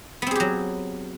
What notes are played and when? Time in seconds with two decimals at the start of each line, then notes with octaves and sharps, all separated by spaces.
0.22 B3
0.26 C4
0.31 G#4
0.35 G4
0.40 F#3